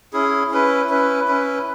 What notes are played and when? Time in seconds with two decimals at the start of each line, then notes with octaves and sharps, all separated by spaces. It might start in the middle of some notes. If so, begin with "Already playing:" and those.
0.13 C#4 E4 G#4
0.51 C#4 E4 B4
0.89 C#4 E4 B4
1.28 C#4 E4 B4